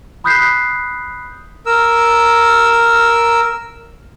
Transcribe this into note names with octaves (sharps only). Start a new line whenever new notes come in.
B5 D#6 F#6 G6 B6 C7
A#4 E6